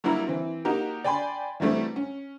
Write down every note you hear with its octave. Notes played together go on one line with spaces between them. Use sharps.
F#3 G3 A#3 D4 E4 A#4
E3 C4
A#3 D#4 F#4 G4 A#4
D5 G5 G#5 B5 C6
E3 F#3 G3 A3 C4
C#4